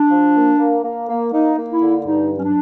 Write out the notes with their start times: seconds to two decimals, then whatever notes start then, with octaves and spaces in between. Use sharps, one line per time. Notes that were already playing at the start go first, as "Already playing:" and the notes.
Already playing: D4
0.11 F3
0.36 A#3
0.59 A#3
0.84 A#3
1.09 A#3
1.33 A#3 D#4
1.57 A#3
1.70 E4
1.82 D3
2.06 G2 D#4
2.31 F#3
2.39 C#4
2.43 D4